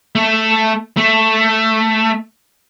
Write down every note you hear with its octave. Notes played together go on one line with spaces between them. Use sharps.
A3
A3